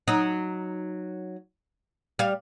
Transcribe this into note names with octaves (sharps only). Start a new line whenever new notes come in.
F#3 D#4
G3 F5